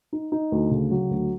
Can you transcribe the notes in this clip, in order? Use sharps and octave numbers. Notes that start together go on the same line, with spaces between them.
D#4
D#4
D2
C#3
F#3
D2